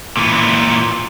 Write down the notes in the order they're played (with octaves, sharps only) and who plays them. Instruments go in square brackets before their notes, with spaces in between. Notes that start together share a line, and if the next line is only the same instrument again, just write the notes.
[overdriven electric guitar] A#2 E3